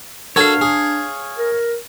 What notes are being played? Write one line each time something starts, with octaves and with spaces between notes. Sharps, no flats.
D4 F#4 A4 A#4 C#5 F5
G#4
A#4